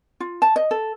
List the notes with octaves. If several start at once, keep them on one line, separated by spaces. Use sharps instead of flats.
F4
A5
D#5
A4